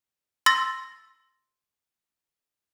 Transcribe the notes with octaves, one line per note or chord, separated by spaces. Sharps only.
C6 E6 A6 A#6